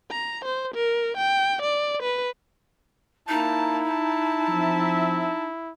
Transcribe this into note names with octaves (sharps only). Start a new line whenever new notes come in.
A#5
C5
A#4
G5
D5
B4
A#3 D#4 E4 A5
A5
F3 C4 E5